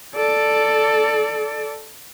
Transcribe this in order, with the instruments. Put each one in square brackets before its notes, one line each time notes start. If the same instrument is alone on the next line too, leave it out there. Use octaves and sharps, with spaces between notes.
[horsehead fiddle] A4 D5